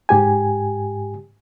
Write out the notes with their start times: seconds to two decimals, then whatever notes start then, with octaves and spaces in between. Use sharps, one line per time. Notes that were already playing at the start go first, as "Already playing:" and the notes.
0.09 G#2 G4 G#5